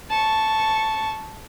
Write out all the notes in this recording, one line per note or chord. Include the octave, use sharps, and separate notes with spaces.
A5 C#6